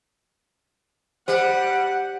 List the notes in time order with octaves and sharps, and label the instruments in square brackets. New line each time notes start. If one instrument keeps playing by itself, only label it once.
[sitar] G3 [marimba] C5 [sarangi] F#5